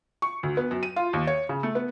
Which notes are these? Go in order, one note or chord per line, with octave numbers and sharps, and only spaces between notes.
C#6
D2
B3
F#2
D#7
F4
D#2
C#5
C#3
A3
B3